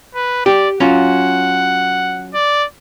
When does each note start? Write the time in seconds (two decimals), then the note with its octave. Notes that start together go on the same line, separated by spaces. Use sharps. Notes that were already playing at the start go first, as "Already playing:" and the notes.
0.15 B4
0.46 G4 D5
0.80 F#3 C#4 F4 F#5
2.34 D5